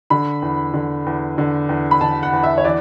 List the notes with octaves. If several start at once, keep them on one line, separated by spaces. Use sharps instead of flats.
D3 B5
E2
D3
E2
D3
E2
B5
D3 A5
F#5
E2
E5
C#5
E3 D5